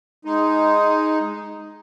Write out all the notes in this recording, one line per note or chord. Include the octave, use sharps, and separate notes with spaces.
G#3 D#4